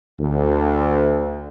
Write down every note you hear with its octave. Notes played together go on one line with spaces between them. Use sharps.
D2